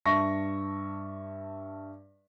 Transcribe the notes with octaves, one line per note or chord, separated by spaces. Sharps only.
G2 E5 A5 C#6 A#6